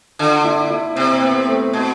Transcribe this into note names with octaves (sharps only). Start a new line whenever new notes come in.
D3 F4
E4
E4
C3 C4
C4
B3
A3
B2 C4